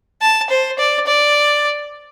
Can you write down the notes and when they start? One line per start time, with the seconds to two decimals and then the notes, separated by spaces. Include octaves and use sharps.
0.21 A5
0.50 C5
0.79 D5
1.07 D5